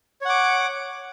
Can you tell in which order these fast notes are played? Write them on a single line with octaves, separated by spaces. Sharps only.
C#5 F#5 D6